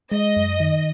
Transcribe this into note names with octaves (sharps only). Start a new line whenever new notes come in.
G#3 D#5
F#2
D#3